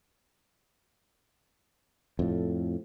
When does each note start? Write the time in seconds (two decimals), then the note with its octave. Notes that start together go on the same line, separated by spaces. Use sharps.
2.19 F2 A2